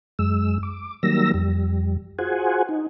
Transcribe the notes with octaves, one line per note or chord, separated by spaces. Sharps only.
F#2 G#3 E6
D6
D#3 F#3 G3 A#3 E6 A#6
F2 G3
F4 F#4 G#4 C5 F#5 G#5
D#4